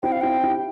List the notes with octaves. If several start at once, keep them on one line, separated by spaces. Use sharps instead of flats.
C4 E4 G5
F5
C4 E4 G5
E4 G4